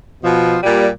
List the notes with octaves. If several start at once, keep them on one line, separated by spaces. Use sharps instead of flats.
B2 F3
A#2 G3